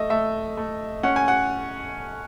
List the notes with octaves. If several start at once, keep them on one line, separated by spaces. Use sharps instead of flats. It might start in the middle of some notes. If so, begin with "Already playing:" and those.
Already playing: A3 D#5 E5
A3 E5
A3
C#4 F#5
G#5
F#5